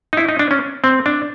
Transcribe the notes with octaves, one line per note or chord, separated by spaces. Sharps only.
D#4
E4
D#4
D4
C#4
C4
D4